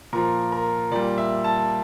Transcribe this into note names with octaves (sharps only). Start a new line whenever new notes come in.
A#2 F3 A#4
A#4
A#2 G3 D5
E5
A5